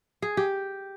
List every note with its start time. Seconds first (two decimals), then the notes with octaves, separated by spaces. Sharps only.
0.22 G#4
0.37 G4